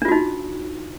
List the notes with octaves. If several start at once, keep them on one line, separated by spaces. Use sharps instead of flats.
D4 D#4 F4 F#4